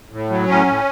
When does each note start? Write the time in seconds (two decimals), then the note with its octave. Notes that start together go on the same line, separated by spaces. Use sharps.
0.11 A2
0.30 F#3
0.48 A2 C#4
0.67 A2